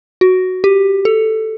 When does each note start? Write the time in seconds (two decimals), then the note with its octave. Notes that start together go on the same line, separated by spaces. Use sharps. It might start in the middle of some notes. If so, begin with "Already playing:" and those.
0.21 F#4
0.64 G4
1.05 A4